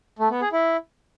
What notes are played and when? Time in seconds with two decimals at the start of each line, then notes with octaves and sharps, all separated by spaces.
0.19 A3
0.30 B3
0.41 G#4
0.52 E4